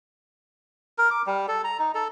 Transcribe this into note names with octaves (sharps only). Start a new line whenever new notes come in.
A#4
D6
G3
A4
A#5
D#4
A4